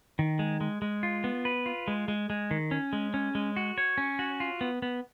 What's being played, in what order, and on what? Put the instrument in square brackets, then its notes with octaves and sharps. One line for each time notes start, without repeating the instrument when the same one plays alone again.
[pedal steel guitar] D#3
G#3
G#3
G#3
F4
B3
B4
F4
G#3
G#3
G#3
D#3
C#4
G#3
C#4
G#3
F#4
C#5
C#4
F#4
F4
B3
B3